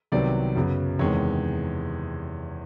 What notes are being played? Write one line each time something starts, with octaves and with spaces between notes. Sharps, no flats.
C2 C3 D#3 F#3 B3 D5
F#2 C#3 F#3 B3
E2 C3 D#3 G#3 C#5